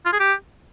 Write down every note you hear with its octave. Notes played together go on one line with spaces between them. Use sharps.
F4
G#4
G4